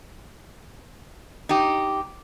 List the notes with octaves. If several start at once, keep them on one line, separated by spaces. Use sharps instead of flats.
D#4 G4